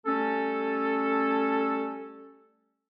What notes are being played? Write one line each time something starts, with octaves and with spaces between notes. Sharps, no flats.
G3 A3 C#4 A4